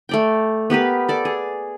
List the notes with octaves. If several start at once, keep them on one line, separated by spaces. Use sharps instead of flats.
A3 D5 G5
B3 G4 A#4 B4
A4 D5
G#4